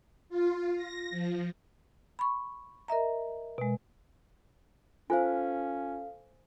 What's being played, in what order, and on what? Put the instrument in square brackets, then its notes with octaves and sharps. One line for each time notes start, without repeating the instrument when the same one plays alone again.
[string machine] F4
A#6
F3
[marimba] B5 C#6
A#4 D#5 E5 A#5
B2 G#3
[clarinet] C#4 [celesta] F4 [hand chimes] A4 F5 [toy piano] C5 G#5